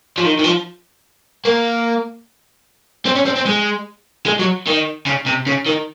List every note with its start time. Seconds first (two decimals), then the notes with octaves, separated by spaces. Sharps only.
0.18 F3
0.25 D#3
0.39 D#3
0.44 F3
1.45 A#3
3.06 C4
3.15 C#4
3.25 C4
3.36 C4
3.46 G#3
4.26 G#3
4.39 F#3
4.67 D#3
5.06 C#3
5.26 C3
5.46 C#3
5.66 D#3